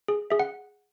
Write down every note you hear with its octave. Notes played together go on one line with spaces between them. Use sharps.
G#4
G#4 E5
F#5